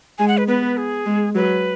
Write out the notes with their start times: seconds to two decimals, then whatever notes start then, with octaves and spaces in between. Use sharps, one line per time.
0.19 G#3 G#5
0.28 F#5
0.38 B4
0.48 B3 B4
0.77 G#4
1.06 G#3
1.35 F#3 B4